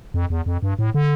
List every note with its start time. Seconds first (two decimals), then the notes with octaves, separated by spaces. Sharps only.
0.14 F2
0.30 E2
0.46 F2
0.63 G2
0.79 A2
0.94 D3